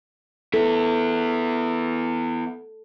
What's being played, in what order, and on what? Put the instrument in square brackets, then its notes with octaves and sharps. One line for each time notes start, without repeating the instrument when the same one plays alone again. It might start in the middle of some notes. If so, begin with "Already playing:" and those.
[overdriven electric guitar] B3 E4 [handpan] A4